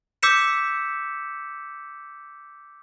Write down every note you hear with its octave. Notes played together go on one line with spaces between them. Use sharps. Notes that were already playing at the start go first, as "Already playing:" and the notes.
D6 E6 G6 B6 C#7 E7